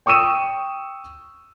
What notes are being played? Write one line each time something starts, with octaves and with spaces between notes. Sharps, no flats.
G5 C#6 D#6 E6 D#7 E7